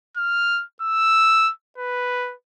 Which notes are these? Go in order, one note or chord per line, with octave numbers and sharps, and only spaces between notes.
F6
E6
B4